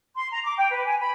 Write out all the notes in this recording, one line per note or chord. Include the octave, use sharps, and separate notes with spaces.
C6
A#5
D6
G5
B4
G#5
B5